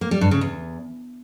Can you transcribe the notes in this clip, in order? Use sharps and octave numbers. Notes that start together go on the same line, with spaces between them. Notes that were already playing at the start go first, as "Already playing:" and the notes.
A#3
G3
G2
C#3
E2